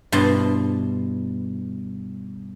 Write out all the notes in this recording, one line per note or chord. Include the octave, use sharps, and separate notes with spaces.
G2 B2 E4 A5 C6